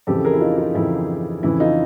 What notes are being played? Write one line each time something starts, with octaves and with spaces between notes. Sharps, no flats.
F2 C#3 E3 G4 A4
G#4 A#4
E4
D#4 F4
D#4 F4
F2 C#3 E3 E4
F2 C#3 E3 E4
D#4 F4